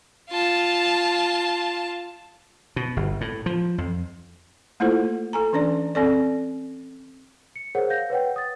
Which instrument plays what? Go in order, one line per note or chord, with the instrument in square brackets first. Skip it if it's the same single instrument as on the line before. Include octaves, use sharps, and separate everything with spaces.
[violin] F4 A5
[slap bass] B2
G1
A2
F3
F2
[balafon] A3 A#3 E4 F4 A4 C5
A4 G#5 A#5
E3 C#4 D4 D5
C4 A4 D5
[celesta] C#7
G#4 A#4 C5 C#5 F#5
F5 G6 A#6
B4 C#5 F#5 G5
D#6 A6